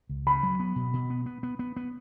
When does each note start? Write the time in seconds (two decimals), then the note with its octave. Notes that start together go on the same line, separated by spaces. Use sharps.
0.09 C#2
0.27 C#3 B5
0.43 F#3
0.60 B3
0.76 B2
0.94 B2
1.10 B3
1.26 B3
1.43 B3
1.59 B3
1.76 B3